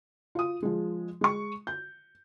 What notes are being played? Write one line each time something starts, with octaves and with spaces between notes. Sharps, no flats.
F4 D#6
F3 G#3
G#3 C#6
G6